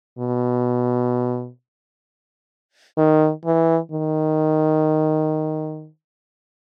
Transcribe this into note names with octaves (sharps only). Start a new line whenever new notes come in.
B2
D#3
E3
D#3